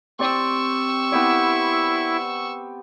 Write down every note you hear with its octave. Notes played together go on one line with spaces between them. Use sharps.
C4 G4 D5 C#6 E6
B3 E4 G4 D5